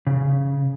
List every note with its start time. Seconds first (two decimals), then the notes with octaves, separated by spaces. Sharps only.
0.07 C#3